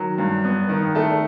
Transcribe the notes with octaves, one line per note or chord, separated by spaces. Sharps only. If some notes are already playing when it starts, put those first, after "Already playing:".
Already playing: D#3 F#3
G2
B3
D#3
A3 A5